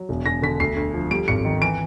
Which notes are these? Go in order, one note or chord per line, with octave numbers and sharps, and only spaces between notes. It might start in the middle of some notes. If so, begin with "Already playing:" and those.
Already playing: F#3
E1
E1 A#6
D3 B6
D2 C7
D2
F3
G3 D7
G#1 C#7
D#3
E3 D7